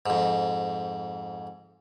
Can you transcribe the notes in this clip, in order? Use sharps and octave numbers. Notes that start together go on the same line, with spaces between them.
F2 G#2